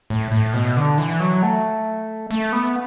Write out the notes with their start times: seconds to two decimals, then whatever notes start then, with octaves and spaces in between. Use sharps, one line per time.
0.10 A2
0.32 A2
0.54 B2
0.77 D3
0.98 E3
1.20 F#3
1.43 A3
2.31 A3
2.52 B3